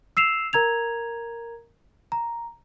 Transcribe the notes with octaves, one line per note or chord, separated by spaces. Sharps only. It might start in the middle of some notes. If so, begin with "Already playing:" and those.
E6 C7 E7 F7
A#4 A#5 G#6 F7
A#5